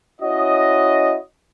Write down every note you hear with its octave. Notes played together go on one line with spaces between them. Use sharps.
C#4 E4 F#4 C#5 D#5